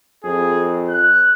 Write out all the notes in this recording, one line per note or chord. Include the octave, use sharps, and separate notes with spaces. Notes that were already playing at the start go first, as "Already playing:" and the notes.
F2 G#4
F#6